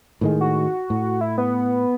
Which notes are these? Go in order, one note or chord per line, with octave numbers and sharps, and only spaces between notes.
A2 D#3 G#3
F#4
A2
E4
B3